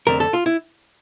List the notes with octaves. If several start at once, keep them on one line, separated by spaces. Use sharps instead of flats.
F2 D3 A3 C4 A#4
A4
F4
E4